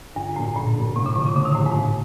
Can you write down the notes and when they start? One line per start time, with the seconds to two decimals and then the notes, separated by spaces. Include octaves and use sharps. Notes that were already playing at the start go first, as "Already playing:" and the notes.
0.15 G2 D3
0.36 A2 F#3 A#3 D4
0.56 A#2 D3
0.75 F#3 A#3 D4
0.95 A2 C3
1.06 D3
1.16 C3 F3 A3 D4
1.26 C#3
1.36 A2 D3
1.45 D#3
1.55 A2 F3 A3 D4
1.66 G#2
1.75 A2